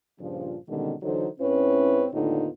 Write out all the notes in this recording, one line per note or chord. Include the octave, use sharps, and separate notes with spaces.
G2 A#2 C#3 F3
B2 D3 D#3 G3 G#3 C#4
D3 E3 F#3 D#4 A4 C5
G#2 C4 C#4 E4 B4 C#5
D#2 A2 D3 B3 D#4 F4